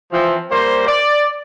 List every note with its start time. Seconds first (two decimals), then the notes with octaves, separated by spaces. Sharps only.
0.12 E3 F3 C4
0.51 G3 A#3 A#4 C5
0.87 D5